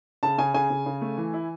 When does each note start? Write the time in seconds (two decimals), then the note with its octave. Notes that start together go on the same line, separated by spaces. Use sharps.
0.23 C#3 A5
0.38 C#3 G#5
0.54 C#3 G#5
0.70 C#3
0.86 C#3
1.01 A3
1.17 E3
1.34 E4